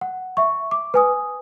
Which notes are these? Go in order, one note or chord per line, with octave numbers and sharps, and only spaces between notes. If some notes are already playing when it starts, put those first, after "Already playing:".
F#5
E5 C#6
D6
B4 G#5 D#6